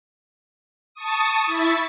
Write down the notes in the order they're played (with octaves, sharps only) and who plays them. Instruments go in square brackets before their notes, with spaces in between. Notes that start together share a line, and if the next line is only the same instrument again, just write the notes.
[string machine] A5 C#6 D#6
E4 E5 C#6 A6 C#7